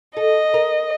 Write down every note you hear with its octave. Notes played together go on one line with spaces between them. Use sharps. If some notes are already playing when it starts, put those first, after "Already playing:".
A4 D#5
A#4